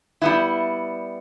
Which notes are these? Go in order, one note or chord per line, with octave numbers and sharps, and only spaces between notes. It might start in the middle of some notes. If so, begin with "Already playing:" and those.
G3 B3 E4